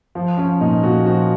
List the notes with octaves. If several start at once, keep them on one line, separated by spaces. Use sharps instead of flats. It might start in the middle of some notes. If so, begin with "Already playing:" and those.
F3
F3 C#4
A#2 D#4
A#2 F#4
F3 F#4